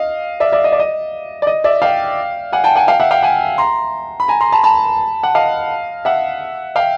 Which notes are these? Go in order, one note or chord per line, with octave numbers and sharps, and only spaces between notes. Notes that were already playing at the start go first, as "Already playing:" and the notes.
Already playing: D#5 F5
D5 E5
D5 E5
D#5
D5
D#5
D5
D#5
D5 E5
F5 G5
F#5 G#5
G5 A5
F#5 G#5
F5 G5
E5 F#5
F5 G5
F#5 G#5
A#5 C6
B5
G#5 A#5
A#5 C6
A5 B5
A5 B5
F#5
D#5 F5
E5 F#5
F5 G5